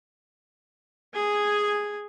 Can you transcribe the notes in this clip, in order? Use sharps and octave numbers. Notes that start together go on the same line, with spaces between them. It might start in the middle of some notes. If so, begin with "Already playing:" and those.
G#4 G#5